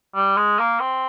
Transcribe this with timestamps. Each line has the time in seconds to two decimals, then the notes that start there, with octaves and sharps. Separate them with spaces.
0.15 G3
0.37 G#3
0.59 A#3
0.80 C4